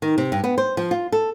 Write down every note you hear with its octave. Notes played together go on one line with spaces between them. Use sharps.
D#3
C3
G2
B3
C5
F3
F4
A4